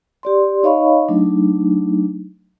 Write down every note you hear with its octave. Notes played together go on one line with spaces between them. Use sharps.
G4 D5 C6
D#4 C#5 D#5 F5 B5 C#6
F#3 A3 D4 D#4